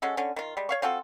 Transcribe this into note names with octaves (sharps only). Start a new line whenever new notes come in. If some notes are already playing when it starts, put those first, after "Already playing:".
G#3 C#4 F#4 A4
D3 C#4
D#3 F4
G3 G#3
C#5 F5 C#6
C4 F4 F#4 A4